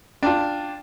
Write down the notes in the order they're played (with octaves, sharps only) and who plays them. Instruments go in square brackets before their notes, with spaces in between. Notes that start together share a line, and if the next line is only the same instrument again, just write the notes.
[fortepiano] D4 F4 [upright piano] G5 A5